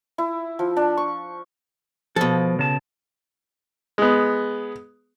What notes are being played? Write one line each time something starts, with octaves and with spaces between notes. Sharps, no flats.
E4
F3
D4
C#6
B2 F3 A4
C#3 A5
G#3 B3